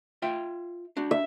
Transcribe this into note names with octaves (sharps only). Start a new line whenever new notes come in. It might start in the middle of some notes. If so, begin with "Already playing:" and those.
F4 E5 G5
D4 F#4
E5